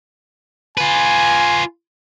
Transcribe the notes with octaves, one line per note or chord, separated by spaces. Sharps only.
F4 B4 G#5